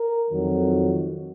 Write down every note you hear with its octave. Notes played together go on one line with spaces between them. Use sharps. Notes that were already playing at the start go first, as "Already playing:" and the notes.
Already playing: A#4
F2 D#3 F#3